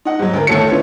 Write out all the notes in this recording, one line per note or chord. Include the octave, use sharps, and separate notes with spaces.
D#4 D#5 F#5
G#2 F#3
D2 A#4
D#2 A3 A4 C#5 C#7
C#4 D4 E4 F4 B4 C#5